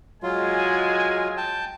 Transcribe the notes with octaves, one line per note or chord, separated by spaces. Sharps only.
F#3 G#3 F4 G#5
G5 A5